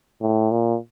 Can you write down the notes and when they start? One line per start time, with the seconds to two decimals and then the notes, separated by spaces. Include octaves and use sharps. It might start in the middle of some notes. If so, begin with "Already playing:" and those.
0.22 A2
0.51 A#2